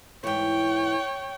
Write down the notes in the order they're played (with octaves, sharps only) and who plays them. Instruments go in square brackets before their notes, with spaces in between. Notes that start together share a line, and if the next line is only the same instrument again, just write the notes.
[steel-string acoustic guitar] G#2 E3 [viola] C#5 G5